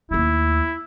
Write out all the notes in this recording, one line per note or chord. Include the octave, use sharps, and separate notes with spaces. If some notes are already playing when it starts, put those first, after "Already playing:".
D#2 A3 E4